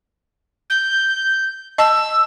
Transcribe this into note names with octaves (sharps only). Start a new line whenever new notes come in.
G6
D#5 A5 E6